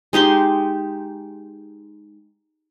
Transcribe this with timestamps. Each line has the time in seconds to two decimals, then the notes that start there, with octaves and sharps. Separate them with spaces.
0.13 G#3 D#4 G4 C6